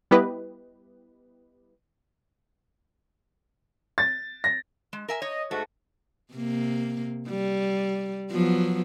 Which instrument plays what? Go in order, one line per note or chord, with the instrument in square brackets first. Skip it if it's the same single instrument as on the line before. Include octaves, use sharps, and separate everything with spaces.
[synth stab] G3 B3 E4 G4 B4 D#5
[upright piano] A6
A#6
[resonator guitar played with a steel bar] G#3
A#4 E5 G#5
[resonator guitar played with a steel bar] C#5 [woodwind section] D#5
[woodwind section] G#2 F#4 [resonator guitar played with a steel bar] A3
[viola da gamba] C3 A#3
G3
F3 F#3 B3